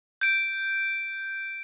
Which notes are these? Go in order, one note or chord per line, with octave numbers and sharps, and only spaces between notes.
G6 D7